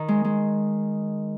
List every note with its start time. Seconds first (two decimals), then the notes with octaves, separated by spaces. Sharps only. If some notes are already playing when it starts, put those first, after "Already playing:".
Already playing: D#3
0.08 G#3
0.25 G#3